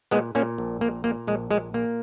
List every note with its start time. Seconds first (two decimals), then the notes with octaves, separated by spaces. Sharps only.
0.11 A#2 G#3 B3
0.35 A#2 A#3 C#4
0.58 A#1
0.81 A#2 A#3
1.04 A#2 A#3
1.27 A#1 G#3
1.50 A#2 G#3
1.74 A#2 A#3